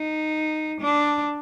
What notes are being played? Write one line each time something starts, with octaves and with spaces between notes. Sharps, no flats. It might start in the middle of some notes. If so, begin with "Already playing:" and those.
Already playing: D#4
D4